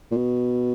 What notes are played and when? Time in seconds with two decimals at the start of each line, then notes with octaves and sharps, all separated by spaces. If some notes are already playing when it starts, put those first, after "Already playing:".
0.11 A#2
0.16 B2